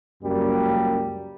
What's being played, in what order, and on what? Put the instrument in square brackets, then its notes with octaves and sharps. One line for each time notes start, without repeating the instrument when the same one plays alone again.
[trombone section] C#2 F#2 G3 A#3